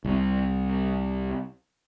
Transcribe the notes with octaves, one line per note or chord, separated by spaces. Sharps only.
C2 C3